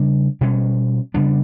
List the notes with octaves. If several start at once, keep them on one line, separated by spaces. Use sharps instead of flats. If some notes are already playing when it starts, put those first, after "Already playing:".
Already playing: C#3 G3 D4
B2 G3 C#4
C#3 G3 B3 D4